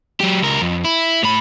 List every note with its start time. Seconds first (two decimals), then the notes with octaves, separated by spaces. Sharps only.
0.20 F#3 G4
0.43 C#2 A#4
0.61 F2
0.84 E4
1.23 A2 B5